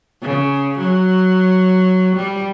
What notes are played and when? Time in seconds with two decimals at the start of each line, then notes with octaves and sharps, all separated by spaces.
0.22 C#3
0.79 F#3
2.16 G3